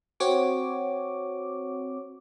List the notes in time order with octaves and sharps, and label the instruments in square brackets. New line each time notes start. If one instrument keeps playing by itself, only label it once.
[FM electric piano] C4 F#4 C#5 D6